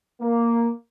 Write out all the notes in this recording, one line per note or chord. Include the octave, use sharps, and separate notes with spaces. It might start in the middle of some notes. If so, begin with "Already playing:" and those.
A#3